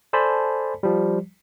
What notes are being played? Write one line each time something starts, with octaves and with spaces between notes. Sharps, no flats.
A4 C5 D5 G#5 A5 B5
F3 G3